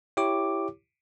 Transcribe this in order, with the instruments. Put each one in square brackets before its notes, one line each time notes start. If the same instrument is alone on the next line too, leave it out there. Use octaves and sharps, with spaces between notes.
[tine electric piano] E4 G4 C#5 D6